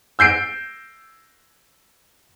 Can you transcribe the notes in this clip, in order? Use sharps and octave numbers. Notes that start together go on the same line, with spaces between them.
E6 G6 C7 D7